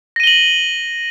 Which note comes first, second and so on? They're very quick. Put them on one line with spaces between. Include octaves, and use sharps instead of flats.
A#6 D#7 G7 F#7